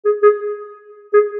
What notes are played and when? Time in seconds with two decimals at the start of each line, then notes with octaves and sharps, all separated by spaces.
0.05 G#4
0.23 G#4
1.13 G#4